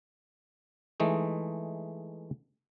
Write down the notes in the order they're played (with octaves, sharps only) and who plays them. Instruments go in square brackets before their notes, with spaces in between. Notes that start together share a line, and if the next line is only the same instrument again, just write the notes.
[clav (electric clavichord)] E3 G#3 A3 D#4